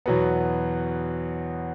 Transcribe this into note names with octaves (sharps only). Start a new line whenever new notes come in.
E2 B2 F#3 B3